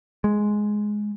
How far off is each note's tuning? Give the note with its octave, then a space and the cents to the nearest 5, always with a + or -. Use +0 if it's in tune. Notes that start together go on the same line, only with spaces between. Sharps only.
G#3 +5